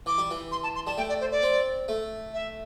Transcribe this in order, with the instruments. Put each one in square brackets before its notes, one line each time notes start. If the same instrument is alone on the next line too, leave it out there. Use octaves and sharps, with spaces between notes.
[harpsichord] E3 [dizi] D6
[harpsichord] G3
E3
[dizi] C6
A5
C6
[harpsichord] G3 [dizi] A5
[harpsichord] A3 [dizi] G5
[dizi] D5
C5
D5
[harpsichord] C4
A3
[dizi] E5